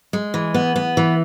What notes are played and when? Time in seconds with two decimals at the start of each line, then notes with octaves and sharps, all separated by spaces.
0.13 G#3
0.34 E3
0.54 B3
0.76 B3
0.97 E3